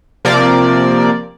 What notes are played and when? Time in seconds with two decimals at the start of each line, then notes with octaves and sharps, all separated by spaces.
0.25 C3 F3 A#3 A#4 D5